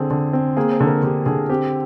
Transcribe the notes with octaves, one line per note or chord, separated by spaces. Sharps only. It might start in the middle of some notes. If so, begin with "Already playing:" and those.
Already playing: D3 C4 G#4
D3
C4
A#3 G#4
C5
D3
A#4
D3 G4
D3 G#4
C4 G4